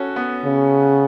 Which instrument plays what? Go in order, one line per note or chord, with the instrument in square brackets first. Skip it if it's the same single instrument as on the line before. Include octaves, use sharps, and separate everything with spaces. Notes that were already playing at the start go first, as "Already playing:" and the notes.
Already playing: [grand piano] C#4 F#4 A4
B3
[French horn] C#3